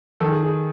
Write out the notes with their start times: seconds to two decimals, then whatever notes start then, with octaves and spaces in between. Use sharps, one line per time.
0.20 D#3 A4
0.28 G#4
0.42 G#4